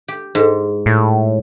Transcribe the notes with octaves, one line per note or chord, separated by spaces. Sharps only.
G4
G#2
A2